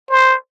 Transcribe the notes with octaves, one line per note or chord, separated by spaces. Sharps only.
C5